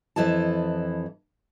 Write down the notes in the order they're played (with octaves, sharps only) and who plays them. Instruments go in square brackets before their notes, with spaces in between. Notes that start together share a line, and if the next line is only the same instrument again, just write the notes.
[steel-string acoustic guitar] F2 E3 E4 D#5 A5